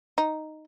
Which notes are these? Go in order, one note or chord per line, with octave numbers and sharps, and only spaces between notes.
D#4